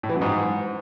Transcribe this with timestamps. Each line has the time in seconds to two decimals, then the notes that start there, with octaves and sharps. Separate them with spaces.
0.03 A2
0.09 E3
0.15 F#2
0.21 G#2